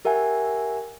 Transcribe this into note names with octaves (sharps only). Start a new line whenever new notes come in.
G4 A#4 E5 F#5 G#5